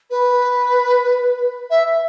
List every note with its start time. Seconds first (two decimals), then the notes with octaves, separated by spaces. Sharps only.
0.10 B4
1.70 E5